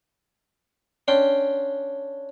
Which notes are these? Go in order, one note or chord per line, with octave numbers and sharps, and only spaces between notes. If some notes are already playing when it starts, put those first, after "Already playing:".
C#4 D4 G5 C6